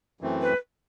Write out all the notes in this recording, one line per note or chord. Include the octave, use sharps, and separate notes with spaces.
F#2 E3 A3 C4
B4